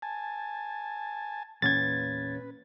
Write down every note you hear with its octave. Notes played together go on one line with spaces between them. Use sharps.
G#5 A5
E2 A#2 C#4 B4 G#6 A6